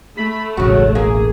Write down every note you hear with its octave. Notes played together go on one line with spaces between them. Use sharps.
A3 B5
E1 A1 C#3 F#3 F#4
A#3 G#4